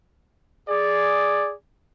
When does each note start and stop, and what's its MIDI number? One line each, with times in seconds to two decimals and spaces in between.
0.68 1.53 68
0.68 1.53 74